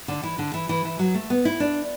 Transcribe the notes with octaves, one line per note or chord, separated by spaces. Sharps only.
D3
E3
D3
E3
E3
E3
F#3
A3
B3
E4
D4